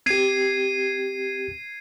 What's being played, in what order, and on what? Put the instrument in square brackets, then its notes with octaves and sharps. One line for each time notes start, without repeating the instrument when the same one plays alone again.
[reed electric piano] C4 G4 [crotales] G#6 C7 D#7